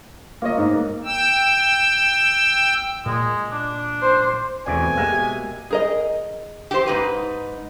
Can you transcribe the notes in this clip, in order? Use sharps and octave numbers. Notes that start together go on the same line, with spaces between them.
A#3 F4 C#5 D#5
G#2
G5 E6
A#2 G#3
D4
C5
E2 B2 A3 B3 C4 D5 G#5
B2 G#3 A#3 G4 E5
G#4 A#4 D#5
G4 C5
G#2 D#4 B4